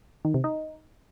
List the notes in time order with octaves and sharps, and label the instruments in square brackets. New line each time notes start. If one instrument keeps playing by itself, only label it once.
[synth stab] D#3
C3
D#4